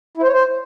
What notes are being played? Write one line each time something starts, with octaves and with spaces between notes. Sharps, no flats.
E4
C5
C#5
C5